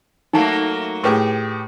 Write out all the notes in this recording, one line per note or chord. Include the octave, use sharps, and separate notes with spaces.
F#3 A3 A#3 D#4 A5
A2 G4 G#4 B4 C#6